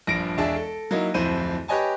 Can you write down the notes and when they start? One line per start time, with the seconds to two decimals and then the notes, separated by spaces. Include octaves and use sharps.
0.07 A#1 G2 F3 A#6 D7
0.38 E1 D4 G#4 E5 A5
0.56 A4
0.91 F#3 A#3 D#4 E4
1.14 D1 F2 E4 C5 B5 D#7
1.68 G4 B4 C#5 D#5 G#5 A5